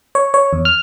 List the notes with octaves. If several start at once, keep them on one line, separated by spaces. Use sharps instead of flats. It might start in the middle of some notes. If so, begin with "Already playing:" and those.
C#5
C#5
E2
F6